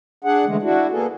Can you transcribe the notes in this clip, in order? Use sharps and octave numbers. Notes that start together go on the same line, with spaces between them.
D4 G#4 F#5
D3 E3 G#3 A3
D4 E4 F#4
A#3 B3 G#4 A4